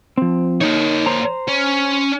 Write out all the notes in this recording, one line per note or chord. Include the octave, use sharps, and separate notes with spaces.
F3 C4
A#3 D#4 C#5
C5 A#5
C#4